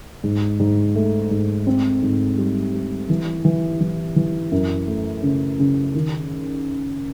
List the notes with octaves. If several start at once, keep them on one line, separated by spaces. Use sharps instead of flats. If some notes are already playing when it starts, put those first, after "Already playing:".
G#2
G#2
A3
G#2
C4
G#2
G3
G3
E3
E3
E3
E3
F#2
A3
C#3
C#3
D#3